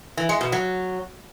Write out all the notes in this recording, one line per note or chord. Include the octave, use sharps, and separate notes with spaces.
E3
G#3
B2
F#3